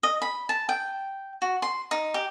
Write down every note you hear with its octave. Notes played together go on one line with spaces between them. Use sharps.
D#5
B5
A5
G5
F#4
C6
D#4
G4